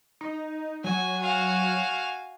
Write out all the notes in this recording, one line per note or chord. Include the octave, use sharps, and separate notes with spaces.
D#4
F#3 F#4 G#5
F#4 F5 G#5 F6